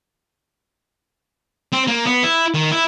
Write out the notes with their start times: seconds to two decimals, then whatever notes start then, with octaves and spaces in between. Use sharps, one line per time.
1.72 C4
1.87 A#3
2.06 B3
2.23 E4
2.54 D#3
2.72 E4